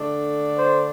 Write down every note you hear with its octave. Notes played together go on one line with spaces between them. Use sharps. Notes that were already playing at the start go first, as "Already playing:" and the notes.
Already playing: D3 A3 D4
C5